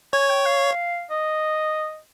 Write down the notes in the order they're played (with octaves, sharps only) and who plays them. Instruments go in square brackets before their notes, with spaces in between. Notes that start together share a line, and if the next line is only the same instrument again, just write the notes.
[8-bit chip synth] C#5 [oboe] G#5
[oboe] G5
F5
D#5